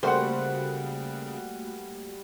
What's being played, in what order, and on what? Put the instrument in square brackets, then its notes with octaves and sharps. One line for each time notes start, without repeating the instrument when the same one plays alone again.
[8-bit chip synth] C#3 [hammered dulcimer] G3 F#5 [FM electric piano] A3 A#3 F#4 [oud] C5